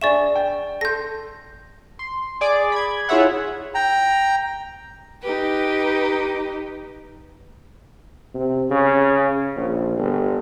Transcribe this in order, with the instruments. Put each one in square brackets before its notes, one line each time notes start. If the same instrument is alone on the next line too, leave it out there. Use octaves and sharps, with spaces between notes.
[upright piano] D4 G#4 E5 [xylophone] D5 C#6 E7
[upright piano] G5
[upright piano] A4 C6 [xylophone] G6 A#6
[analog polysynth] C6
G#4 D5 D6
B5 G#6
E4 F4 G#4 C#5 E5 F#5
[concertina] G5 A#5
[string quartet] D#4 G4 B4
[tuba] C3
C#3
A#1
G1